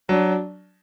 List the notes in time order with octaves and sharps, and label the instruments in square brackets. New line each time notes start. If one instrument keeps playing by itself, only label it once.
[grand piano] F#3 [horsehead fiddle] D4